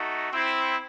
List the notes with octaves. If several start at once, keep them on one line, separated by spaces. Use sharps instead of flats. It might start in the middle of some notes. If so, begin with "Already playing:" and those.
Already playing: A3 D#4 F#4
C4 E4